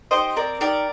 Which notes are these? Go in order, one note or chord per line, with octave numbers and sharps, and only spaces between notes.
D#4 G4 C5 D#5
C4 A#4 D5
D#4 G4 A#4 D5